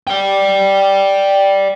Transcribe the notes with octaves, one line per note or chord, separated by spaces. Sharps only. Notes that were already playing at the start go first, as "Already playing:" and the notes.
D5 G5